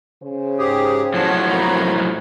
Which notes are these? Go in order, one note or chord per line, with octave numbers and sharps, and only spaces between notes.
C#3 C5
G#2 G4 G#4
A2 F3 F#3 A5
F2 A#4 C5 A#5 B5